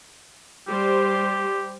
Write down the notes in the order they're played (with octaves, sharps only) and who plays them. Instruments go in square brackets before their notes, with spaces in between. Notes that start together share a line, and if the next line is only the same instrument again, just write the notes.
[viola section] G3 C5 [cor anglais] G4